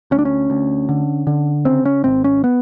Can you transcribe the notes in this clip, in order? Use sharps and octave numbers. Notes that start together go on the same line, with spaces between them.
D2 C#4
D4
C#4
D2
D3
D3
C#3 C4
C#4
G#1 C4
C#4
B3